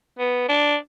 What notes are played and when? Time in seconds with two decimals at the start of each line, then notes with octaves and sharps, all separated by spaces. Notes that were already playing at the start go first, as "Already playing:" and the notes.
0.19 B3
0.49 D4